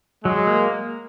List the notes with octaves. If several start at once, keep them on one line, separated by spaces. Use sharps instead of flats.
F#3 G#3
A#3